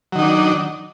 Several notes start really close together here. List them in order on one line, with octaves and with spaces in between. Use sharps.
F#3 D#3 D#4 D4